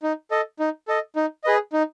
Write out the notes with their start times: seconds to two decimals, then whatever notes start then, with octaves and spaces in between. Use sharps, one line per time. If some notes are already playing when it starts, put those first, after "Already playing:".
0.03 D#4
0.31 A4 D#5
0.59 D#4
0.88 A4 D#5
1.16 D#4
1.44 G#4 B4 D#5
1.73 D#4